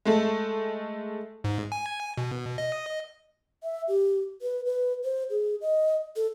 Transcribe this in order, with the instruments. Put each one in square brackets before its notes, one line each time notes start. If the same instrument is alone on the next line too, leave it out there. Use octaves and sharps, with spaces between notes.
[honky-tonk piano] G#3 A3 A4
[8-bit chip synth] G#2
G#5
B2
D#5
[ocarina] E5
G4
B4
B4
C5
G#4
D#5
A4